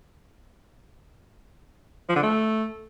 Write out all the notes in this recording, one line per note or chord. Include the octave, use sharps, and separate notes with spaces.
F3
D3
A3